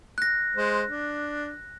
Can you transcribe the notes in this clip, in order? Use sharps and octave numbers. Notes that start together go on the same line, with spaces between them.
F#6 A#6
G#3 C5
D4